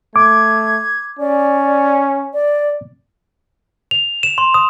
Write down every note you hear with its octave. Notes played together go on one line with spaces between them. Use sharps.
A3 D6 G#6
C#4 D5
D5
F7
E7
C6
D#6